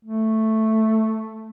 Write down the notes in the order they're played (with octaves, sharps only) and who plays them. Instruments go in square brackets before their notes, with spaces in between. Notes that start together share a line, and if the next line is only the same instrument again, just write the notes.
[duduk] A3